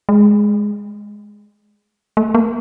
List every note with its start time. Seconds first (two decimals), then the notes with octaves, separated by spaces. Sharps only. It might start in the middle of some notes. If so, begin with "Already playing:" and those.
0.09 G#3
2.17 A3
2.35 A#3